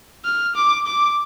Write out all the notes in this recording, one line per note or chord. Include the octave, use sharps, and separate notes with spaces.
F6
D6
D6